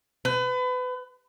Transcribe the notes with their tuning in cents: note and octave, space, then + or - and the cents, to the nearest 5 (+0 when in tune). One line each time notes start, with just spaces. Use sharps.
B4 +30